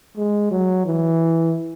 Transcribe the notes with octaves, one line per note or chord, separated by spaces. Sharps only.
G#3
F#3
E3